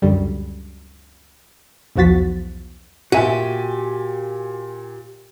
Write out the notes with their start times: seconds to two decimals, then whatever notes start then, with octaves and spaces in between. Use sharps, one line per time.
0.02 C#2 F#2 D3 G3
1.96 B1 E2 F3 F#4 A6 B6
3.12 A#2 F#4 G4 E5 F#5 G#5 D#7